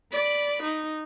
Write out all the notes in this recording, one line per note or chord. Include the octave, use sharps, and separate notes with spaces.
D5 B5
D#4